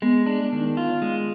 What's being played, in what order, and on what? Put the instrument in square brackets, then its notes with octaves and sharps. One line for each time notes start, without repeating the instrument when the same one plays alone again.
[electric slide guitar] G#3 [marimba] B3
[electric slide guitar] D4
D#3
F4
G#3